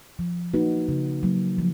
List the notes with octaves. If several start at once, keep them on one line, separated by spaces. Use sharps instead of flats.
F3
A#3 D#4 F#4 B4
C#3
F#3 A#3
F3